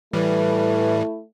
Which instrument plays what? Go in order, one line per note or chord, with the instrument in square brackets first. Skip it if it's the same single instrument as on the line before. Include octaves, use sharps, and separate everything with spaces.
[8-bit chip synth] A2 E3 G3 [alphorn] A3 [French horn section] E4 [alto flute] B4